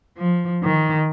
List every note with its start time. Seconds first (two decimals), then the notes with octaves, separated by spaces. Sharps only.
0.18 F3
0.63 D#3